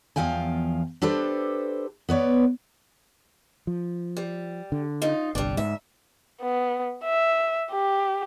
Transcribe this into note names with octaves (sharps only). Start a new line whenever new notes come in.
E2 F3 F5 G5 G#5
D4 G4 A4 B4 C5
B3 B4 C#5 D5
F3
G3
D3
F#2 D#4 F4
G1 C2 G3 D4
D2 G#2 E5
B3
E5
G4